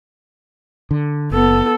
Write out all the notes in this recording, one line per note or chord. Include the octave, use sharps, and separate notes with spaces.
D3
F#1 B3 A4